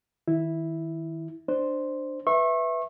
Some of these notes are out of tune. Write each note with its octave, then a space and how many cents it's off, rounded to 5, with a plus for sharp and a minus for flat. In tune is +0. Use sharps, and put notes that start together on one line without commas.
D#3 +30 E4 -5
D4 +15 C5 +0
B4 +0 E5 +0 C#6 -35